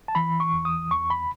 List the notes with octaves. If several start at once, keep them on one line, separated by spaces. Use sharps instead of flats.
A5
E3 B5
C#6
E2
D#6
E2 C#6
B5